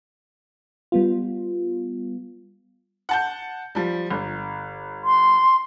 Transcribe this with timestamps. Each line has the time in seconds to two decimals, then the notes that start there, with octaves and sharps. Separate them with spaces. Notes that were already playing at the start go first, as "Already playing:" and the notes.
0.92 G3 B3 F4
3.09 F#5 A5 G6
3.75 F3 G3
4.10 G1
5.04 C6